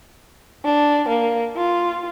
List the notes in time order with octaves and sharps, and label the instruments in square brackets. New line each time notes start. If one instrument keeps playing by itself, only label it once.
[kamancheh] D4
A#3
F4